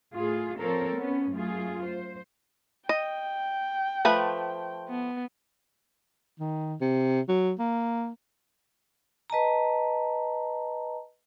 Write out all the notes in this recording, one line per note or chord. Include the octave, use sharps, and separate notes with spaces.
A2 F4 G#4
F3 C4 A4 A#4 C#5
B3 C#4
F#2 A3 F4 G#4
C5
D#5 G5
F3 A3 B4
B3
D#3
C3
F#3
A#3
B4 D#5 A5 A#5